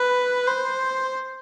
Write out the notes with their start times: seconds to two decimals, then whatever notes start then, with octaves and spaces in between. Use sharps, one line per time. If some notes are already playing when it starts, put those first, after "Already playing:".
Already playing: B4
0.47 C5